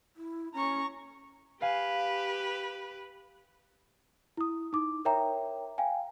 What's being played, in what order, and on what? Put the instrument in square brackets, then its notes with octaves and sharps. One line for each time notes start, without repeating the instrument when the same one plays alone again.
[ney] E4
[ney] C#4 [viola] A#5 C#6
[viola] G4 B4 [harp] F5 G#5
[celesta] E4 D#6
D#4 D6
A#4 C#5 E5 G5 A#5
F5 G5 G#5